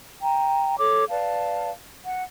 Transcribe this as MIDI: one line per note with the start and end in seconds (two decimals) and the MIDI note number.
0.21 0.79 79
0.21 0.79 82
0.79 1.04 69
0.79 1.04 73
0.79 1.04 86
1.09 1.69 71
1.09 1.69 74
1.09 1.69 77
1.09 1.69 81
2.05 2.24 78